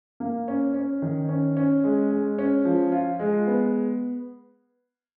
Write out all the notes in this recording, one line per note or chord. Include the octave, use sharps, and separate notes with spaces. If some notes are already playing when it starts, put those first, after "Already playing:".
A#3
C#4
C#4
D#3
C#4
C#4
G#3
G#3
C#4
F3
F4
G#3
B3